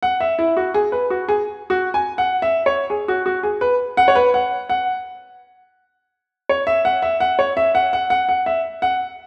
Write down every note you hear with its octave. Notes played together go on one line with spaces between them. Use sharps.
F#5
E5
E4
F#4
G#4
B4
F#4
G#4
F#4
G#5
F#5
E5
C#5
G#4
F#4
F#4
G#4
B4
F#5
C#5
B4
F#5
F#5
C#5
E5
F#5
E5
F#5
C#5
E5
F#5
F#5
F#5
F#5
E5
F#5